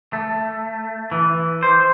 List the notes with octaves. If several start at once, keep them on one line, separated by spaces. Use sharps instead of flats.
A3
E3
C5